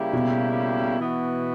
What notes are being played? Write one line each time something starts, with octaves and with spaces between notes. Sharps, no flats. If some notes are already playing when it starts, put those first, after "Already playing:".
Already playing: C#3 G3 A#3 E4 G4
B2
E3 B3 F#4